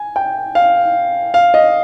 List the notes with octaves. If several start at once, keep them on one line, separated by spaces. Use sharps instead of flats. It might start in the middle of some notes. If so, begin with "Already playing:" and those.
Already playing: G#5
G5
F5
F5
D#5